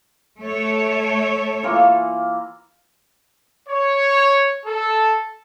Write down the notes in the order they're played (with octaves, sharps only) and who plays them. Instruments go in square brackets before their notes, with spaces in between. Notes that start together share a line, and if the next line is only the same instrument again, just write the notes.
[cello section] A3 A4 C#5
[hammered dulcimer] E3 A#3 F4
[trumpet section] C#5
A4